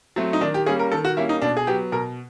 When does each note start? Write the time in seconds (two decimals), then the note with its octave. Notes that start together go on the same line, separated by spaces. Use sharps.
0.16 F#3 A3 C4
0.33 D#4
0.41 D#3 D4
0.54 G4
0.66 G3 A#3 C#4 G#4
0.79 A#4
0.92 D#3 A4
1.05 F#4
1.17 G3 A#3 C#4 E4
1.29 D#4
1.42 B2 D4
1.57 G#4
1.67 F#3 B3 G4
1.92 B2 A#4